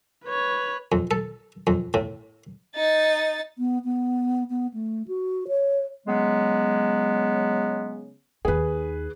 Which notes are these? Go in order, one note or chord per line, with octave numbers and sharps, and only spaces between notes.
B4 C#5
F2
A4
F2
A2
D#4 A6
B3
B3
B3
A3
F#4
C#5
C#3 F#3 G#3 B3
D#2 D#4 G#4 B4